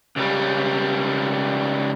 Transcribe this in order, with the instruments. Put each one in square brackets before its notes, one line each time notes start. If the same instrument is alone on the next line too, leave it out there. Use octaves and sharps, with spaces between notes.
[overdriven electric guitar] C#2 G3